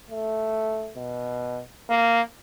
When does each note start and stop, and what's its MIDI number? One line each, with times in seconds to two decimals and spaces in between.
0.11 0.92 57
0.97 1.62 47
1.90 2.21 58